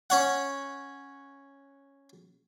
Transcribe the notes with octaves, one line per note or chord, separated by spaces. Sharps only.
C#4 C#5 F#5